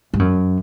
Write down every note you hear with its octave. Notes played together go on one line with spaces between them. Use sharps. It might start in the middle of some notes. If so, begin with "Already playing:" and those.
G2
F#2